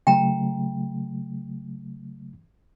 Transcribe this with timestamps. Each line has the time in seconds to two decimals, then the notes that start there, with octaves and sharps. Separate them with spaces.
0.07 C#3 F#3 A3 G5 A#5